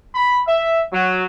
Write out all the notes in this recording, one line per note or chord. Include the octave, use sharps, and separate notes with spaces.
B5
E5
F#3